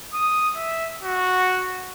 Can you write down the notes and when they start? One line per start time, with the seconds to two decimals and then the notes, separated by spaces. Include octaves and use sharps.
0.14 D#6
0.56 E5
1.03 F#4